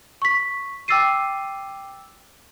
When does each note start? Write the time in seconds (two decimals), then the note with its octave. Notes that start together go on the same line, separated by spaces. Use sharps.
0.22 C#6 B6
0.88 G5 D6 E6 A6 C7 D#7